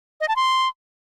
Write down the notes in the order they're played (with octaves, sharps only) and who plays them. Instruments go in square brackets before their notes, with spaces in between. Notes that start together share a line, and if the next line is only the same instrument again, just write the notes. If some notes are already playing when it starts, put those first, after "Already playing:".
[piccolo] D#5
A5
C6